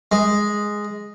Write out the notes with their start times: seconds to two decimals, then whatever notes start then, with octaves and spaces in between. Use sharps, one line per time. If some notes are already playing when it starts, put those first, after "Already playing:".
0.12 G#3